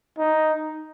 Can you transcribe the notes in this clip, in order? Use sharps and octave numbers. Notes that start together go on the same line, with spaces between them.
D#4